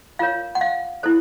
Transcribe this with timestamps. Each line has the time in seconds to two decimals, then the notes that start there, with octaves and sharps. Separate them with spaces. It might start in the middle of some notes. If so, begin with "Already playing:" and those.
0.19 F4 A#4 C#5 F5
0.55 F#5
0.61 F5
1.03 E4 A4 C5